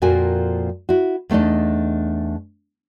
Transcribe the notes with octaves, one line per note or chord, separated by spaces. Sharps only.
F2 A#2 F3 F#4 A#4 G#5
E4 F#4
E2 A3 D4 D#4 D#5